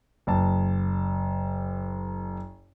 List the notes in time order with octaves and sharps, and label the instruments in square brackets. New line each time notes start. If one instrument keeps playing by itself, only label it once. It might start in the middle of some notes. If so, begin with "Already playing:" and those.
[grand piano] F#1 A5